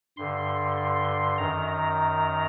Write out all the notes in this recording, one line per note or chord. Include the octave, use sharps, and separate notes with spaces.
G2 D3 C6
C6
C6
F#2 D#3 A#5
A#5